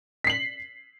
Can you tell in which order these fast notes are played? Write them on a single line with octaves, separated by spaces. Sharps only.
B6 C7 F#7